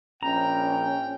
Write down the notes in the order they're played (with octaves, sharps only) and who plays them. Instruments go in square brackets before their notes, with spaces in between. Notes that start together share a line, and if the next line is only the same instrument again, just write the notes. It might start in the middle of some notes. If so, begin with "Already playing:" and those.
[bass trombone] A#1 [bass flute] C#4 [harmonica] G5 [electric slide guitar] A#5